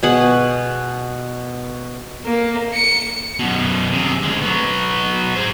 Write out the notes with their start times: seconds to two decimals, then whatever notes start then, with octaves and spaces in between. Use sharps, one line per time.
0.03 B2 G#4 F#5
2.25 A#3
2.73 C#7
3.39 F#2 B2
3.92 C3 G#4
4.23 D2 G#3
4.42 F#3 B3
5.36 G#4 C5